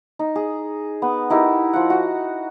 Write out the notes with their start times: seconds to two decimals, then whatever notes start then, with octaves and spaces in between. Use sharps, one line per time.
0.19 D#4
0.36 G#4
1.02 B3
1.30 D#4 E4 G4 A#4
1.73 F3 F#5
1.90 F#4